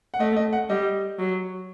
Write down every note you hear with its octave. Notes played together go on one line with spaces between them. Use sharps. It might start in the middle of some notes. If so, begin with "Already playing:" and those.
F#5
A3 D#5
D#5
F#5
G3 D#5
F#3